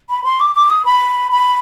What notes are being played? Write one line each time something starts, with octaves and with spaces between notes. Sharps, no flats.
B5
C6
D6
D6
D#6
B5
B5